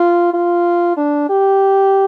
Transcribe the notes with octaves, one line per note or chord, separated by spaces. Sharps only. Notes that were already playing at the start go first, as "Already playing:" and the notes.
Already playing: F4
F4
D4
G4